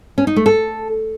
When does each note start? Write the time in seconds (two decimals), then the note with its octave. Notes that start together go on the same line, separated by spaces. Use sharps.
0.18 C#4
0.27 D#4
0.36 A3
0.46 A4